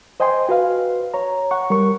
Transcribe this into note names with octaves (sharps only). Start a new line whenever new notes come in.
C5 D#5 G5 G#5 C6
F#4 B4 F5
C#5 A#5
F#5 C#6
G3 A#4 C#6